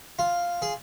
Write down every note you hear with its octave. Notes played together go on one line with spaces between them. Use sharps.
F4
G#4